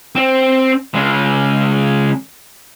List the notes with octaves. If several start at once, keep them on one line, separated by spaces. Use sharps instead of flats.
C4
C#3 G#3